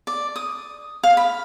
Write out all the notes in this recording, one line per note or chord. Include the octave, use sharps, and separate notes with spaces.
D5
D#6
F5
B5